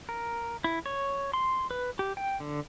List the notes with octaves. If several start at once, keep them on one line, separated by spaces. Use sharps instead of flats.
A#4
E4
C#5
C6
B4
G4
G5
D3